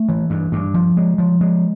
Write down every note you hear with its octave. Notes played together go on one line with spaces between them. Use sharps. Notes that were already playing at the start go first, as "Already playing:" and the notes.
Already playing: A3
E3
G2
G2
F3
G#3
F3
G#3